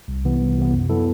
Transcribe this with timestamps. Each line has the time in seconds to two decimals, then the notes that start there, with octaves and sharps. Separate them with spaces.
0.08 C2
0.25 C3 E3 B3
0.41 C2
0.58 C3 E3 B3
0.73 F#2
0.89 F#3 B3 E4 A4